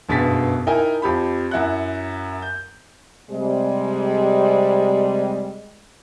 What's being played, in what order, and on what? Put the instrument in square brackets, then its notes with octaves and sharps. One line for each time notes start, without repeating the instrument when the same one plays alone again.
[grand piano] F#1 G2 B2 G#4 A6 B6
D#4 E4 A#4 G5 G#5 A#5
F2 G4 B5
F#2 E4 F#5 F#6
G6
[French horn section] C3 G3 G#3